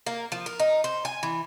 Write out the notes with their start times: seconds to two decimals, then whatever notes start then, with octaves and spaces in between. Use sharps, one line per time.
0.06 A#3
0.32 F3
0.46 A#4
0.60 D#4
0.84 C5
1.05 G#5
1.23 E3